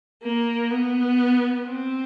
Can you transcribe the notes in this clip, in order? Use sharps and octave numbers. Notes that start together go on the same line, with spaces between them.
A#3
B3
C4